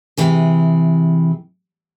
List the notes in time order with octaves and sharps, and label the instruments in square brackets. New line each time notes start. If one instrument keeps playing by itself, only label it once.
[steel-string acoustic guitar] C3 E3 G#4